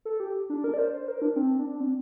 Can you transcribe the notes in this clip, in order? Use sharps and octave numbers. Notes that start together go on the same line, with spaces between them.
A4
G4
D4
A#4
D5
C5
C5
A#4
D4
C4
D4
C4